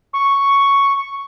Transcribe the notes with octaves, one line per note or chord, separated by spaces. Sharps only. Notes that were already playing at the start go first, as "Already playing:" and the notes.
C#6